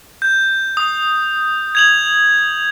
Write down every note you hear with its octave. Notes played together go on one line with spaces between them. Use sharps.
G6
D#6
G#6 F7 F#7